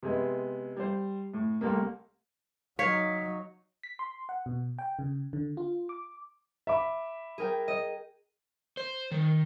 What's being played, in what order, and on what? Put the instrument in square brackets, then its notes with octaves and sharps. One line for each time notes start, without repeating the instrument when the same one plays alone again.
[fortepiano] C3 G#3 B3
G3 C5
A2
C2 G3 A3 A#3
[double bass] F#3 D#4 [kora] C#5 [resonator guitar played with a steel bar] F5 [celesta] B6
[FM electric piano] B6
C6
F#5
B2
G5
C#3
D3
F4
D6
[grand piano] E5 B5 D6
[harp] G#4 A#4 G5
D#5
[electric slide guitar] C5
D#3